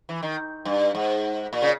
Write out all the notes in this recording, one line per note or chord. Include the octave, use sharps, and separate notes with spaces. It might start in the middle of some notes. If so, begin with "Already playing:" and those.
E3
D#3
G2
G#2
A#2
C#3